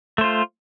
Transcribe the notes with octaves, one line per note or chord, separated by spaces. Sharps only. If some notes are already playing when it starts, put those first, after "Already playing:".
A3 F4 C5